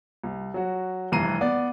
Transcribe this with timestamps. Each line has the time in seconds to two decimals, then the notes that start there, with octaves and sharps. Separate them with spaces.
0.24 C2
0.54 F#3 F#4
1.12 F1 G2 E3 A#5 C7 D#7
1.41 B3 D5